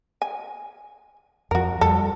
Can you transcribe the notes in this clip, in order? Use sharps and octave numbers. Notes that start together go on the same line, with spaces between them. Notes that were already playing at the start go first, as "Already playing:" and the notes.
G#5
F2 F3 F#4 A#4
F2 G3 A4